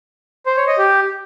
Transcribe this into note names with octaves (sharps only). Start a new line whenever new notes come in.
C5
C#5
D#5
G4